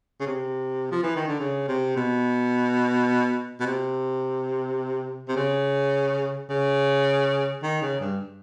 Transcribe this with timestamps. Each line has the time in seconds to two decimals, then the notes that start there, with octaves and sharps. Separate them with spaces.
0.20 C#3
0.26 C3
0.91 F3
1.03 E3
1.16 D#3
1.28 D3
1.40 C#3
1.68 C3
1.97 B2
3.60 B2
3.66 C3
5.29 C3
5.36 C#3
6.49 C#3
7.63 D#3
7.82 C#3
8.01 G2